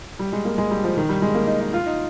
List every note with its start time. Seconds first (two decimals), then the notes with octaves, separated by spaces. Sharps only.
0.19 G3
0.32 G#3
0.45 A#3
0.58 G#3
0.71 G3
0.84 F3
0.97 D#3
1.09 G3
1.22 G#3
1.34 A#3
1.47 D#4
1.61 D#4
1.73 F4
1.86 D#4